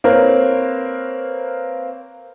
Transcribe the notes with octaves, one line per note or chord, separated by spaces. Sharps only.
A#3 C4 A#4 B4 C#5